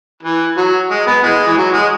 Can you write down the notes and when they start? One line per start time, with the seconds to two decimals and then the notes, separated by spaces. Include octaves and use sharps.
0.23 E3
0.57 F#3
0.91 G#3
1.07 B3
1.24 E3 G#3
1.46 E3
1.58 F#3
1.74 G#3